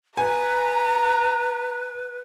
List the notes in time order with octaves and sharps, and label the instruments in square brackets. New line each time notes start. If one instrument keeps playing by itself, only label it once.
[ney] B4 [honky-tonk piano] G#5 [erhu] A#5